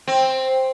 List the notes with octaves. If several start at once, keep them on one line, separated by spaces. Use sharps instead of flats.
C4